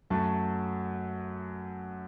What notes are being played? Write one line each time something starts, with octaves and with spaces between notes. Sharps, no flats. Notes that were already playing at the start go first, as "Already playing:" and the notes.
F#2 F#3 A3 A5